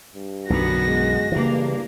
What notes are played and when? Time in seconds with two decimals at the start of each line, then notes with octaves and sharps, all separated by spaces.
0.15 G2
0.50 B1 F#2 D3 B3 F#4 A#6
0.87 G#3
1.32 G2 C#3 E3 A#3 D4